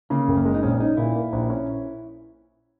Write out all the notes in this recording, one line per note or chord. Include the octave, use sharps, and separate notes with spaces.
C#3 A#3
F#1
A#3
G#3
D#4
A#1 C#4
C#4 D#4
A#2 E4
A#3
A#1
C#4